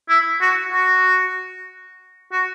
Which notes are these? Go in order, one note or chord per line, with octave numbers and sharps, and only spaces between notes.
E4
F#4
F#4
F#4